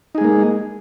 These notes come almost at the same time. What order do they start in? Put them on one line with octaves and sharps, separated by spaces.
D#4 G#4 G#3 A#3